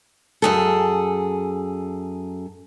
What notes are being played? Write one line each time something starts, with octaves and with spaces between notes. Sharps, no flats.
F#2 G#4 A4